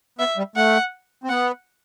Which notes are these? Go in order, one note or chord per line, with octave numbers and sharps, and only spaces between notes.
B3 E5
G3
A3 F#5
C4
B3 F#5